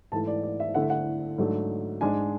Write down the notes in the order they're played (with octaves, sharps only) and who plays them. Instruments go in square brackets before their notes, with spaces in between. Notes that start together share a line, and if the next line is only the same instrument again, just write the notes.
[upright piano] G#2 E3 A3 A5
D5
D5
E5
D3 A3 E4 F#5
E5
F#5
G#2 F#3 A3 D4
G#2 G#3 D4 G#5